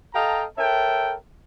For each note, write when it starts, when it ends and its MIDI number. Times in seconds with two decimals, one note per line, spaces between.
0.14 0.44 69
0.14 0.44 75
0.14 0.44 77
0.14 0.44 79
0.14 0.44 81
0.14 0.44 82
0.58 1.15 69
0.58 1.15 70
0.58 1.15 73
0.58 1.15 76
0.58 1.15 79
0.58 1.15 81